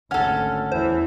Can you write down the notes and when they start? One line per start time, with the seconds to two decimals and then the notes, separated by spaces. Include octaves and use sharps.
0.11 G#1 D2 C#4 A4 F#5 F6
0.72 E2 E3 C5